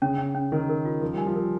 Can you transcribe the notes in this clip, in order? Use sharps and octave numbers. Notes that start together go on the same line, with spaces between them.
C#3 C#4
C#4
C#4
D#3 A#4
A#4
F4
F3 A#4
G3 G#5
F3
A#4